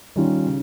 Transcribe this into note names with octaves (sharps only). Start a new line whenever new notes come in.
D#3 G3 C#4 F4
C#3